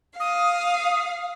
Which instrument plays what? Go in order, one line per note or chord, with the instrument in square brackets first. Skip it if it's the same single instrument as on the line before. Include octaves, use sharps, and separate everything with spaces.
[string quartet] F5 [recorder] D#6